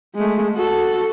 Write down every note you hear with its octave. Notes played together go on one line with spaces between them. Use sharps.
G#3 A3
F#4 A4